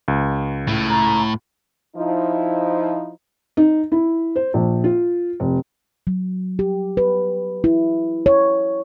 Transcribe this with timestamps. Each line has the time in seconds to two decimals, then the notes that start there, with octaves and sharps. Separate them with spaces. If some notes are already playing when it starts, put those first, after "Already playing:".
0.08 C#2
0.68 A2
0.89 A#5
1.96 F3 D#4 E4
3.57 D#4
3.92 E4
4.36 C5
4.54 A#1
4.84 F4
5.40 F1
6.07 F#3
6.59 G4
6.97 B4
7.64 E4
8.26 C#5